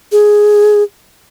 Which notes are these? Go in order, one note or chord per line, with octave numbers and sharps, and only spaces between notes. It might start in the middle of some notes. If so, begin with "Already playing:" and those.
G#4